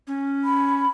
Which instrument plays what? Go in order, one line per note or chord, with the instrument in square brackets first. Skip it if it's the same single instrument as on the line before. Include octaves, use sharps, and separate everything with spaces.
[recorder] C#4
[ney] B5